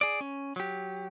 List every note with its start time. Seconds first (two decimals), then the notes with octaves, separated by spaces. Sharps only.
0.01 G#4 D5
0.21 C#4
0.56 F#3 G4